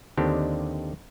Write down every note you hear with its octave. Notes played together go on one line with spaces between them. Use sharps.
D#2 D3 D#3 C4 D4 G4